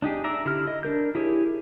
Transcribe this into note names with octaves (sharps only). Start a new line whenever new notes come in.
D4 D#4 G4 G#4
D5 E5 A#5
D3 E4 G4 F6
D#5
D4 A#4 G6
E4 G4 G#4 C#5